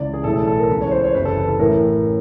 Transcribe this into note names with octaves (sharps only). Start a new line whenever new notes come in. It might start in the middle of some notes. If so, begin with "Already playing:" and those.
Already playing: C#2 C#3 E3 D5
G#4
B1 A2 E3 A4
A4
A4
A#4
C#2 C#3 E3 B4
C#5
C5
C#5
F#1 E2 C3 B4
A4
B4
A4
A1 A2 E3 A#4